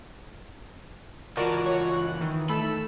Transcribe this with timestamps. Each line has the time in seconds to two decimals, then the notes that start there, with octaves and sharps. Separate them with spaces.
1.37 C#2 E3 F4 F#4 A#4 D5 A5
1.66 C#5
1.93 F#6
2.21 D#3 E3
2.49 A3 D#4 A4 B5 E6